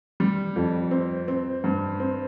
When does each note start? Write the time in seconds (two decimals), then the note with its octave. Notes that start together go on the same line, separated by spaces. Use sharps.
0.20 G3
0.56 F2
0.91 C4
1.28 C4
1.64 G2
2.00 C4